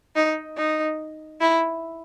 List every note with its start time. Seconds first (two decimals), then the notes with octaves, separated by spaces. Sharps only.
0.16 D#4
0.57 D#4
1.41 E4